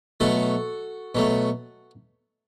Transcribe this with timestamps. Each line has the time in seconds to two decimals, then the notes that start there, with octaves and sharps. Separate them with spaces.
0.20 B2 F#3 A3 F#4 A4
1.15 B2 F#3 A3